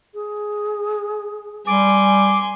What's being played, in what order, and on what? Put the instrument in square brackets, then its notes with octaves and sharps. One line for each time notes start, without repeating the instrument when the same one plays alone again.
[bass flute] G#4
[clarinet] G3 [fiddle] G#5 C6 [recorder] D6